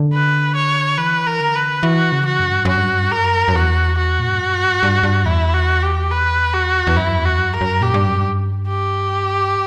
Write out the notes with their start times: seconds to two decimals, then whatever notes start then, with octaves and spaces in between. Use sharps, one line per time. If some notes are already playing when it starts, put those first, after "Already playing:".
Already playing: D3
0.13 B4
0.55 C#5
0.98 E3 B4
1.27 A#4
1.40 D3
1.55 B4
1.83 E3 F#4
2.12 C#3
2.25 F#4
2.40 F#2
2.52 G2
2.65 F#2 F#4
2.77 G2
2.88 F#2
3.02 G2
3.11 F#2 A#4
3.48 F#2
3.54 E2 F#4
3.97 F#4
4.19 A#2
4.29 G2
4.40 F#2
4.61 G2
4.83 G2
5.03 G2
5.25 E2 E4
5.54 F#4
5.82 G4
6.11 B4
6.53 F#4
6.87 E2
6.96 F#2 E4
7.18 E2
7.25 F#4
7.38 F#2
7.53 A#4
7.61 F#2
7.81 A#2 G4
7.94 G2
8.08 F#2
8.20 G2
8.67 G4